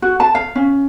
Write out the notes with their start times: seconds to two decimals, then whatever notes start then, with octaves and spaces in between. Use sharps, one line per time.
0.02 F#4
0.20 A5
0.35 F5
0.55 C#4